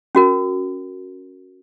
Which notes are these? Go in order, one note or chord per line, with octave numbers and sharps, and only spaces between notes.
C#4 F#4 A#4